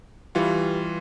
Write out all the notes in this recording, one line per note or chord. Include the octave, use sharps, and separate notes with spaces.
E3 G3 F4 G4 B4